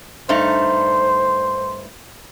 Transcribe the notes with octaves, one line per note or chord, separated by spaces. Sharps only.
G2 A3 D#4 C5